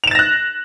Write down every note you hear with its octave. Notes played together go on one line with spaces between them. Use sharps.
F#6 A6 A#6 E7 F7